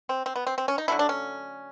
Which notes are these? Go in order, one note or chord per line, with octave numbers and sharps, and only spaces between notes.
C4
C4
B3
C4
C4
C#4
D#4
D3 F#3 A3 E4
D4
C#4